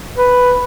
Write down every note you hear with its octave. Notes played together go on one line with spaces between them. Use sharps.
B4